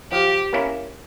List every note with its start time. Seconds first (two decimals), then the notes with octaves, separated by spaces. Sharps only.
0.12 F3 G4
0.53 A#3 C#4 E4